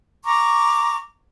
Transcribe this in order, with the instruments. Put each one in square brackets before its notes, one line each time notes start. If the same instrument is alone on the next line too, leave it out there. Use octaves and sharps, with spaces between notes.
[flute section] A#5 C#6 D6